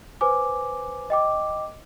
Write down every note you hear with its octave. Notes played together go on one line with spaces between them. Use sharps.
B4 C5 G#5 D6
D#5 G5 D6